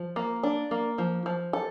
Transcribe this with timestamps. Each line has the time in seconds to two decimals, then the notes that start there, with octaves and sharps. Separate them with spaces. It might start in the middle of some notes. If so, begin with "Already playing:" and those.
Already playing: F3
0.16 A#3
0.43 D4
0.71 A#3
0.98 F3
1.26 F3
1.53 A4